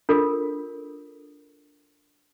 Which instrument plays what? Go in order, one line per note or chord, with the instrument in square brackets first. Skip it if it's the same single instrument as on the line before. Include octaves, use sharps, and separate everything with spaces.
[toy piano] D4 F4 A4 A#4